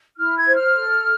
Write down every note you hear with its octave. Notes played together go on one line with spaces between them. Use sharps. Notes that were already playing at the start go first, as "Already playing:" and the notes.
E4 F6
G#6
C5
F6
A4